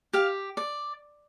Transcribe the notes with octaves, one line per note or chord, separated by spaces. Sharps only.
G4 F5
D5